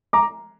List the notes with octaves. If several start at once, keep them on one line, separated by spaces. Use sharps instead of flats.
A#5 D6